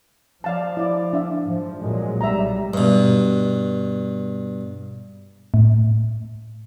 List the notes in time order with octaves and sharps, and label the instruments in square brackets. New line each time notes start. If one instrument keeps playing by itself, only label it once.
[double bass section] F3 [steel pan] D5 F5 A5
[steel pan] E4 D5
D4 E5 F5
[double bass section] G#2 F3
A#2 F#3 G#3
[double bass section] B1 G3 [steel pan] E5 A#5
[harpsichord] G2 B2
[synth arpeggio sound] A2